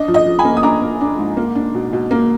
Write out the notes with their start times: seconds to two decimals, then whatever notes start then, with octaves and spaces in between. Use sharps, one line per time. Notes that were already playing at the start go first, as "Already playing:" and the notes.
Already playing: D4 D#5
0.08 F3
0.14 D#5
0.26 F3
0.39 G#5 B5
0.45 A#3
0.57 D#6
0.63 D4 A#5 D6
0.82 A#3
1.01 D4
1.19 G#2
1.37 A#3
1.55 D4
1.75 B2
1.93 B2
2.11 A#3